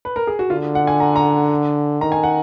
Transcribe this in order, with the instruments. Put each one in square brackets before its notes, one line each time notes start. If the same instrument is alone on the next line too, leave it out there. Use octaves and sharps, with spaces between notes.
[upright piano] B4
A#4
G#4
F#4
[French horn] D3 [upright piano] F4
[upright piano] F#5
G#5
A#5
A#5
[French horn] D#3 [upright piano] A#5
[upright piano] G#5
F#5